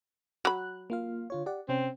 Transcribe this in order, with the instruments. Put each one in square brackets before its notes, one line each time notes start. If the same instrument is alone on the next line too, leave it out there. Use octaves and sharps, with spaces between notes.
[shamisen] F#3 B5 [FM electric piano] F#6
[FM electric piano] A#3 F4 F5
D3 F4 C#5
G4 D5 F#5
[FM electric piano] C3 C#4 [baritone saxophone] C4